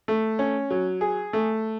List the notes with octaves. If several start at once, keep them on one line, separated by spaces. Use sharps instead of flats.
A3
C#4
F#3
G#4
A3